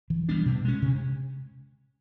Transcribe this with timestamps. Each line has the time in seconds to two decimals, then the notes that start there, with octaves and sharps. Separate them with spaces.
0.10 E3
0.29 G3 B3 D4
0.46 B2
0.65 G#3 C#4
0.82 C3